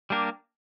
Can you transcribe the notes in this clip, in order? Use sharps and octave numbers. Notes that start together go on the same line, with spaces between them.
G3 A#3 D4 G4 A#4